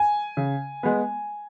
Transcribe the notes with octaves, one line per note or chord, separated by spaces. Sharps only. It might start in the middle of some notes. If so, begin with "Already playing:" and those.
Already playing: G#5
C#3
G#3 B3